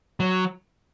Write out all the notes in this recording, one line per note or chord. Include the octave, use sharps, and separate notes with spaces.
F#3